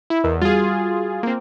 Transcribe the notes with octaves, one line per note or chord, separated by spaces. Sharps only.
E4
E2 A#4 D#5 E6
G3 F4 F#4 G#4 A6
A#3 C4